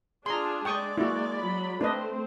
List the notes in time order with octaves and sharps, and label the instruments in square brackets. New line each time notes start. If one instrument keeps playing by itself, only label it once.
[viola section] D4 [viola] F4 G#4 [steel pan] A#5 C6
[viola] G#3 D5 [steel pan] G5 C#6 D#6
[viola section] A#3 [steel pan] E4 F#4
[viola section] F#3 B5
[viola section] A3 C4 C5 [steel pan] D4 B4 D#5